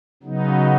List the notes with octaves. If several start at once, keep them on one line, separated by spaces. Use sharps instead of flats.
C#3 F#3 B3 D#4